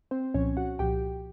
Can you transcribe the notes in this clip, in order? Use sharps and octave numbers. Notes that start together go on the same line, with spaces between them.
C4 C5
C2 A#2 F3 C#4 C#5
F#4 F#5
C2 A#2 F3 G4 G5